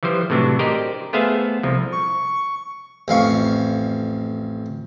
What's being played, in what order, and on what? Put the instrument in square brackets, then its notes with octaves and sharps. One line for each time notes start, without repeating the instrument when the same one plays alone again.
[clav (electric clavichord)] E3 F3 G3 C5
A2 C3 E3 F#3 D4
G4 A#4 C5 D5 D#5
A3 B3 G#4 C5 E5 F5
C2 F3
[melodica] C#6
[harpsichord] A1 F2 F5 C#6